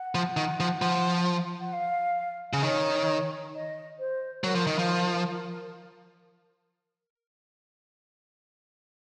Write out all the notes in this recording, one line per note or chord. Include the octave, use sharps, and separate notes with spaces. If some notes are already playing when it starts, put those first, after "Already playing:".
Already playing: F#5
F3
D#3
F3
F3
F#5
F5
C#3
D#3 C#5
D#5
C5
F#3 A#4
F3
D#3
F3